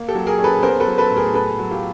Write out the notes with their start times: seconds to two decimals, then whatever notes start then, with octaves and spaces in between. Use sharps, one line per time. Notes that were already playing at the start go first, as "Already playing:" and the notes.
Already playing: A#3
0.08 G4 A4
0.15 F#3
0.27 G#4 A#4
0.39 C#4
0.44 A4 B4
0.63 B3 A#4 C5
0.80 A4 B4
0.87 F#3
0.98 A4 B4
1.10 A2
1.17 G#4 A#4
1.34 B3 A4 B4
1.59 F#3
1.71 F4 G4